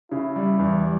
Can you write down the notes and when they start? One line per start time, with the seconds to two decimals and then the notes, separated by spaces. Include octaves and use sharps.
0.11 C#3 E4
0.36 G3
0.59 E2
0.84 G3